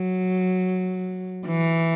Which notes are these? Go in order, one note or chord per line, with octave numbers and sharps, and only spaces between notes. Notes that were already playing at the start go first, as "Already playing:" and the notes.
Already playing: F#3
E3